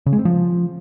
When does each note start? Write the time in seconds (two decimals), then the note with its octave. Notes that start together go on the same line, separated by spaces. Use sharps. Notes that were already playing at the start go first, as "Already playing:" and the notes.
0.06 C#3
0.13 G#3
0.19 C4
0.25 F3